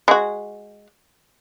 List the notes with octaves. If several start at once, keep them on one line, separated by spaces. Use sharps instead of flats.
G#3 F#4